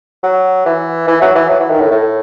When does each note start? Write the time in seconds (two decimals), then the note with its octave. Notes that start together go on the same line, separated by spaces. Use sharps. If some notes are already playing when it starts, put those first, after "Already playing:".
0.23 F#3
0.66 E3
1.07 E3
1.21 F#3
1.35 E3
1.49 F#3
1.60 E3
1.70 D#3
1.81 A2
1.91 A2